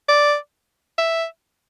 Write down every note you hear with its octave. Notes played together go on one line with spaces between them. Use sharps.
D5
E5